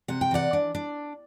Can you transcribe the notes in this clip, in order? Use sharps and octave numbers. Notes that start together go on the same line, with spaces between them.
C3 F#5
G5
E3 D5 F#5
D4
D4